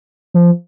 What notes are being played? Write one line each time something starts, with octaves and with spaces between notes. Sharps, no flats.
F3